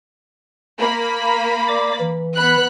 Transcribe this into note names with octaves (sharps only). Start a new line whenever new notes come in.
A#3 B5
D5 D6
E3
B3 B5 F#6